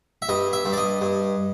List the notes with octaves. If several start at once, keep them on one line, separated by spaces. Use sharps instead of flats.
E5
G2 D#5
E5
G2
D5
D#5
G2